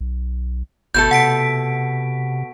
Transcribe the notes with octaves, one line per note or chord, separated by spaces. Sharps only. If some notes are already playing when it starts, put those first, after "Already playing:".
B1
G1 B2 A3 A4 G6
C3 F#5 B6 D7